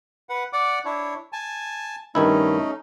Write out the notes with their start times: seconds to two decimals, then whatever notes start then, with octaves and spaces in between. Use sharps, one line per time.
0.29 B4 F#5
0.53 D5 F#5 D6
0.85 D4 E4 C#5
1.33 G#5 A5
2.15 G2 D#3 A3 C#4 D#4 E4